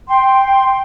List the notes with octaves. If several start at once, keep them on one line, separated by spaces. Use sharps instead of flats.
G5 C6